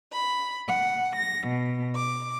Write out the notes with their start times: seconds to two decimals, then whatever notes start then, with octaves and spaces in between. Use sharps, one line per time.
0.12 B5
0.68 F#5
1.16 A#6
1.48 B2
1.95 D6